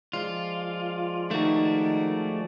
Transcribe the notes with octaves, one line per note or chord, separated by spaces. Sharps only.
F3 G#3 F4 D5
D#3 A3 F#4